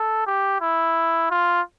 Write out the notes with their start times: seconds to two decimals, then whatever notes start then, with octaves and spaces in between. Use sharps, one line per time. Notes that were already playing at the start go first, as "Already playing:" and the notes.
Already playing: A4
0.27 G4
0.61 E4
1.30 F4